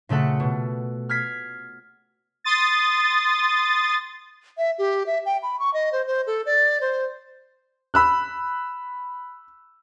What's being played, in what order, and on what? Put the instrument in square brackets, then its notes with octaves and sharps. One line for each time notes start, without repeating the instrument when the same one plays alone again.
[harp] A#2 C#3 A3 A4 F#5
B2
F6 G#6 B6 C7
[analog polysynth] C6 D#6 A6
[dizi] E5
G4
E5
G5
B5
C#6
D#5
C5
C5
A4
D5
C5
[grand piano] B5 E6 F#6